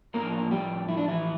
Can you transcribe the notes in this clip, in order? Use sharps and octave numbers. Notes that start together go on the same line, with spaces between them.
A2 F3 A#3 A#4
G3 G4
E4
D4
E3 E4